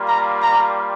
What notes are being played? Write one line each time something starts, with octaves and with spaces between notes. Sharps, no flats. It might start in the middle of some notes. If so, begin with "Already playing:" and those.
Already playing: G3 A#3 F4
A#5
A#5